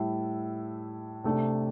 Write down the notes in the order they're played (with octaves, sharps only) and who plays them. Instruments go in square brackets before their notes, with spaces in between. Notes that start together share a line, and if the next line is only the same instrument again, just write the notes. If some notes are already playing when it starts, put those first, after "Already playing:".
Already playing: [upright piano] A2 G3 E4
C3 A3 D4